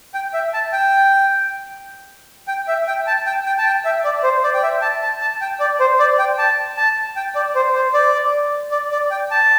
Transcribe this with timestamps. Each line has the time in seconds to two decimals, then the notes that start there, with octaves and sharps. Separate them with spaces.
0.14 G5
0.34 E5
0.54 A5
0.72 G5
2.48 G5
2.68 E5
2.87 G5
3.07 A5
3.26 G5
3.46 G5
3.58 A5
3.66 G5
3.85 E5
4.04 D5
4.23 C5
4.44 D5
4.54 G5
4.63 E5
4.82 A5
5.02 A5
5.21 A5
5.41 G5
5.60 D5
5.80 C5
5.99 D5
6.19 G5
6.39 A5
6.77 A5
7.16 G5
7.35 D5
7.55 C5
7.75 C5
7.94 D5
8.72 D5
8.92 D5
9.11 G5
9.31 A5